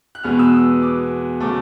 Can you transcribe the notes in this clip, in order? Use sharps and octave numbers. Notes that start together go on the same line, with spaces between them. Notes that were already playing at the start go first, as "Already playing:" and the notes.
F#6
E2 B2 G#3 B3 F6
E6
D#6
D6
C#3 F#3 A3 D6